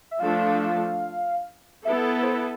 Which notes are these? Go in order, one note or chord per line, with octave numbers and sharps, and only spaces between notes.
E5
F3 A3 D4 A4 F5
B3 E4 A4 E5
C5
B4